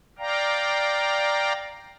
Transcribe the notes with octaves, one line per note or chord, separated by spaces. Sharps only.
D5 F5 G5 A#5